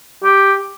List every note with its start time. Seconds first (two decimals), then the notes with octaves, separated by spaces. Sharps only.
0.23 G4